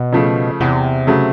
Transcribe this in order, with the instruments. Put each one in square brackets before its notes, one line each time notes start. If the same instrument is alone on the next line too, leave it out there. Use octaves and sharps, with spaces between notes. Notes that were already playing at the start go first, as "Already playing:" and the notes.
Already playing: [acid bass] B2
[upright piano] C#3 F3 A3
[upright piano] E2 [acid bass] C3
[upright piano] C#3 F#3 A3